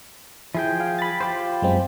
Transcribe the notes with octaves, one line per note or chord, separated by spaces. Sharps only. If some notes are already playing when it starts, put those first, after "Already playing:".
F3 E4 G#4 G5
F5
B5 A6
F4 G4 C5
F#2 G#3 C4